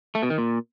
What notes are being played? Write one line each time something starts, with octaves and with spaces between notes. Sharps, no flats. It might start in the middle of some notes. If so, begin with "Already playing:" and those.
A3
B2
D#3
A#2